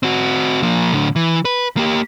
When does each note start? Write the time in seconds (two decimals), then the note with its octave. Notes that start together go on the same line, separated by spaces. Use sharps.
0.03 C4 F#4
0.62 F3 A#3
0.93 A2 D3
1.16 E3
1.45 B4
1.77 A#3 G4